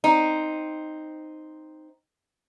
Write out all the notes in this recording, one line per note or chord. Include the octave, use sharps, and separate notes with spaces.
C4 D#4